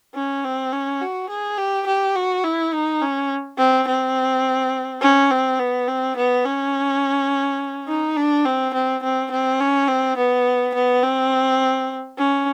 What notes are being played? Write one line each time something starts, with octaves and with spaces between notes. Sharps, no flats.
C#4
C4
C#4
F#4
G#4
G4
G4
F#4
E4
D#4
C#4
C4
C4
C#4
C4
B3
C4
B3
C#4
D#4
D4
C4
C4
C4
C4
C#4
C4
B3
B3
C4
C#4